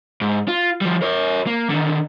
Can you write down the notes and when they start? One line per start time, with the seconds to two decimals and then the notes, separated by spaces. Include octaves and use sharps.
0.21 G#2
0.48 F4
0.81 F3 G3
1.02 A#4 C#5
1.47 A#3
1.70 D3 D#3